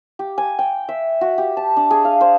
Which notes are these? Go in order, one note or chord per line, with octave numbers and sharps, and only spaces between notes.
G4
G#5
G5
E5
F#4
G4
A5
D4
G#4
F5
C5